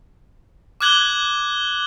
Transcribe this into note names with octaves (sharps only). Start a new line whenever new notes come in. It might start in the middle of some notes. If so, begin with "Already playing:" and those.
D6 F6 F#6 G#6 F#7 G7